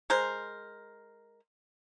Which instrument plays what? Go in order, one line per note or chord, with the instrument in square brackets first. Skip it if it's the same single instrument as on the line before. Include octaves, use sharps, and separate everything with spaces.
[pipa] G#3 A#4 C5